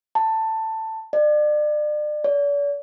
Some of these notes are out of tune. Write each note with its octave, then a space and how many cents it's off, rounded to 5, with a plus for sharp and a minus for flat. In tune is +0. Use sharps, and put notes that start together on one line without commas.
A5 +10
D5 +35
D5 -45